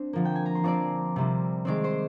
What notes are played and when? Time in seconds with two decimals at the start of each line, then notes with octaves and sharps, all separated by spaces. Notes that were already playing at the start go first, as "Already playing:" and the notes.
Already playing: C4 D4 C5
0.13 D3 F3 A#3
0.25 G5
0.35 G#5
0.45 A#5
0.55 C6
0.64 F3 C4 D5 D6
1.16 C3 G3 C4
1.65 D#3 G#3 C4 D5 D6
1.84 C5 C6